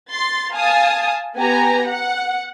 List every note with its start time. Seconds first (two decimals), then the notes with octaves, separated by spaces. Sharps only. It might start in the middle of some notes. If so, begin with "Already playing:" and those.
0.11 C6 A6
0.53 F5 G#5 A5 D#6
1.36 B3 G4 G#5 A#5
1.87 F#5